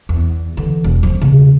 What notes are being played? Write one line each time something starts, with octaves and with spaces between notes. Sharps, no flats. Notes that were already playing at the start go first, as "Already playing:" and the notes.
E2
D3 E3
E1
F3 D4
E1 C#3